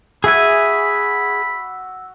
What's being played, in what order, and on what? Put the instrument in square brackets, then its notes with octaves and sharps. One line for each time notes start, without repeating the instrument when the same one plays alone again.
[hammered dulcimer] F#4 E5 F#5 [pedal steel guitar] G#4 G#5 [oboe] B5 [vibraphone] E6